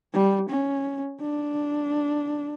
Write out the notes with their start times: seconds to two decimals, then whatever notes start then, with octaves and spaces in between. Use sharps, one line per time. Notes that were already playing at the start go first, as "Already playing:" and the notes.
0.14 G3
0.50 C#4
1.21 D4